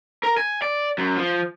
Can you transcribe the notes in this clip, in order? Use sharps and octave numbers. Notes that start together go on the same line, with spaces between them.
A#4
G#5
D5
F#2
F3